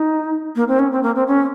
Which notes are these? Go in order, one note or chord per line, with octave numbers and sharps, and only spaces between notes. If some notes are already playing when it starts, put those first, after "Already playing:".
Already playing: D#4
A#3
C4
C#4
C4
A#3
C4
C#4